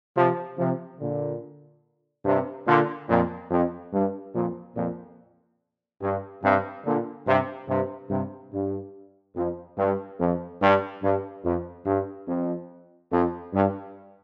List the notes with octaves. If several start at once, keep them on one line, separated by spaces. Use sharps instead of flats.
C3 F3
C3 F3
A#2 D3
G2 C3
A#2 D3
F2 A#2
F2
G2
F2 A#2
F2 A#2
G2
G2 C3
A#2 D3
G2 C3
G2 C3
G2 C3
G2
F2
G2
F2
G2
G2
F2
G2
F2
F2
G2